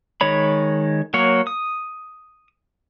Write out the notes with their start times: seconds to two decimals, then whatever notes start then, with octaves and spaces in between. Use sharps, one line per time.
0.21 D#3 G#3 C#5 B5
1.14 F#3 A#3 C#5
1.47 D#6